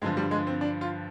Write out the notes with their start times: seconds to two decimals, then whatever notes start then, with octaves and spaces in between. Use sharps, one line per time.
0.02 G2 D3 F3 G#3
0.17 G3
0.31 G#3
0.47 C4
0.61 D4
0.81 F4